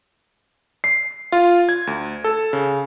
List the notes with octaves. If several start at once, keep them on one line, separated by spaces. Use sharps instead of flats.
C7
F4
G#6
D2
A4
C#3